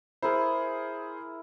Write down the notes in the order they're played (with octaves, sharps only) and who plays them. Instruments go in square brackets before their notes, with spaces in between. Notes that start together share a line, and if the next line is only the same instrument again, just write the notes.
[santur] E4 A#4 [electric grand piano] G#4 C5